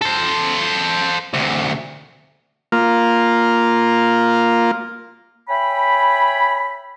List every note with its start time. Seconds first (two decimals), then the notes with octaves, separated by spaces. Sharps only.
0.02 A4 C5
1.34 D2 C3
2.72 A#3 F4
5.49 C#5 E5 G5 G#5 B5